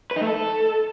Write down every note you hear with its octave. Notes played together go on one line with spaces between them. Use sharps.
B4
D#4
A3
A4